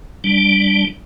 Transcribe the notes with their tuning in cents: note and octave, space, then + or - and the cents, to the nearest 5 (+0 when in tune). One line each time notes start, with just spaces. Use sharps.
G3 +0 D4 +0